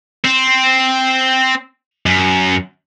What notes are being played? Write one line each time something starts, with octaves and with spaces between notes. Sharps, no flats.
C4
F#2